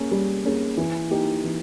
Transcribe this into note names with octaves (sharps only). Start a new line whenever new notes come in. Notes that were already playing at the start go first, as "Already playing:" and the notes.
Already playing: A#3 C#4 G#4
G3
A#3 C#4 G#4
E3
A#3 D#4 G4
E3